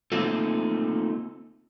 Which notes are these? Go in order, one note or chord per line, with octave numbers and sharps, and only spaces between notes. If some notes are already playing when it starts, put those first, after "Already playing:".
A3 A#3 C4 D#4 F4 A4